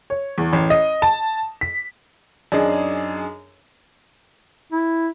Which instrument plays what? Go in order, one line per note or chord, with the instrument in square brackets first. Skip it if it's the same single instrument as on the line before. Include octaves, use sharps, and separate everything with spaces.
[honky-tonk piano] C#5
E2
A1
D#5
A5
B6
[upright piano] F#2 D4 D#4 G#4
[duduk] E4